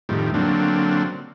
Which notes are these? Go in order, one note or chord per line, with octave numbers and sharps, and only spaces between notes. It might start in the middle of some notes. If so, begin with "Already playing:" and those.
F2 A2 D#3 G3
D3 F#3 A#3 C4 D4